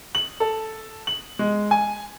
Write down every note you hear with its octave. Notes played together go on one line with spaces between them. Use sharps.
F#7
A4
F#7
G#3
G#5